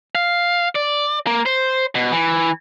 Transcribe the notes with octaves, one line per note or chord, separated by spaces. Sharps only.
F5
D5
A#3
C5
B2
E3